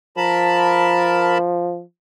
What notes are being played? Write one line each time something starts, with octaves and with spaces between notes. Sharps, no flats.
F3 A#4 A5 B5